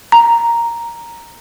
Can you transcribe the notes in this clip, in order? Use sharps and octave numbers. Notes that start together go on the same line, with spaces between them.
A#5